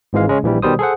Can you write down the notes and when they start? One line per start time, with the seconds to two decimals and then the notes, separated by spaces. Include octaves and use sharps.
0.13 G#1 G#2 E3 G#3 F5
0.27 C#3 G#3 C#4
0.43 A#1 E3 G3
0.62 B2 D#3 G3 C5 D#6
0.79 G#4 A4 C5 F#5